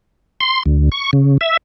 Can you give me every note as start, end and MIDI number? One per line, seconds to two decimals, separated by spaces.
0.41 0.63 84
0.66 0.89 38
0.92 1.11 85
1.13 1.38 49
1.41 1.57 76